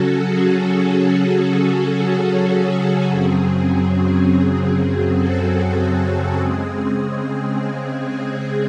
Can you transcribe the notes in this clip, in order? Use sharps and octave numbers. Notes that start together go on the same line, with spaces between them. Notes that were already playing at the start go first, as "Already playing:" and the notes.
Already playing: C#3 F#3 C#4 F#4 A4
G#4
F#4 A4
F#4 A4
G#4
F#2 C#3 F#3 C4
G#4
F#4 A4
G#4
C#3 G#3 C4
G#4